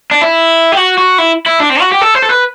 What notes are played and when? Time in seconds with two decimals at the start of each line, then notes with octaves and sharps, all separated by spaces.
0.11 D4
0.22 E4
0.72 G4
0.77 F#4
0.98 F#4
1.18 E4
1.46 E4
1.60 D4
1.70 C4
1.81 F#4
1.92 G4
2.02 A4
2.15 C5
2.23 A4
2.29 B4